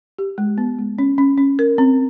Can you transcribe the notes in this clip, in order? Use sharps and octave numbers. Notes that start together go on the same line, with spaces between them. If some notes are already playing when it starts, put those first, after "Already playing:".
G4
G#3
B3
G#3
C#4
C#4
C#4
A#4
C4